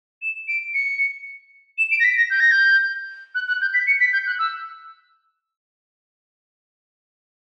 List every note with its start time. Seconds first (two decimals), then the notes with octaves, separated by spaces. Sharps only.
0.22 E7
0.48 D7
0.74 C#7
1.78 E7
1.91 D7
2.00 A#6
2.04 B6
2.17 A#6
2.30 G6
2.40 A#6
2.51 G6
3.35 F#6
3.48 F#6
3.61 G6
3.74 B6
3.87 C#7
4.00 B6
4.13 G6
4.26 F#6
4.39 E6